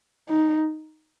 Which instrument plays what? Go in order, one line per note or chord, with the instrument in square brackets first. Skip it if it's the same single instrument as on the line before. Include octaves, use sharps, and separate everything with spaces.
[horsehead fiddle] D#4